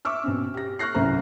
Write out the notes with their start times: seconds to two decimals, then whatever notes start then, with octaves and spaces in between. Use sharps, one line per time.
0.05 E5 C#6 D6 E6 F6
0.24 B2 C4 C#4
0.54 G4 A#6
0.79 C#6 F6 F#6 A#6 C7
0.94 C2 F#2 A2 C#4 C5 A#5